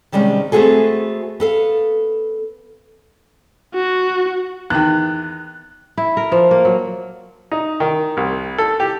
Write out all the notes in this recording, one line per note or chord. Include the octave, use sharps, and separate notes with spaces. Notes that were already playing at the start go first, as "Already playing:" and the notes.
C3 D#3 G3 G#3 C#4
A3 B3 C4 F#4 G#4 A4
B3 A4 F5
F#4
E2 D#3 F#6
E4
A#4
F3
A#3
F#3
D#4
D#3
C2
A4
G4